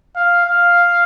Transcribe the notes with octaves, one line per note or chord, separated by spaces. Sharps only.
F5
F5